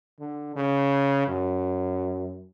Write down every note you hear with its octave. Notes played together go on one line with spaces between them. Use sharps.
D3
C#3
F#2